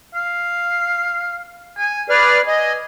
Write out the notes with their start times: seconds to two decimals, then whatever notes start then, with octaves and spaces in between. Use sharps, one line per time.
0.14 F5
1.77 G#5
2.10 G#4 B4 D5 F6
2.47 D#5 G#5